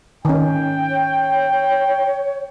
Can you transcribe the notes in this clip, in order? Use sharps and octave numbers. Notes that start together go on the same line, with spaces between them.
D#3 C#4 G5
C#5